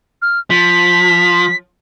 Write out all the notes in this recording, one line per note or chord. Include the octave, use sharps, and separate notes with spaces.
F6
F3 B6